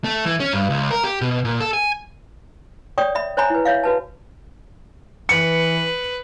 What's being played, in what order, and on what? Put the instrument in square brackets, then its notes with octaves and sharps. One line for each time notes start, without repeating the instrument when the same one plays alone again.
[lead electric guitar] A3
E3
C#4
G2
C#2
A#4
G4
B2
A#2
A4
G#5
[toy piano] C#5 D5 G5 C#6 D#6
E5 B5
C5 C#5 E5 G#5 A#5 B5
E4 B4
C#5 E5 F5
F#4 B4 A5
[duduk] E3 [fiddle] B4 [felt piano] C#7